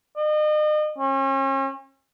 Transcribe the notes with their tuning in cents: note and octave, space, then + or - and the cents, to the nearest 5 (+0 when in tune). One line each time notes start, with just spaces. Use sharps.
D#5 -40
C#4 -40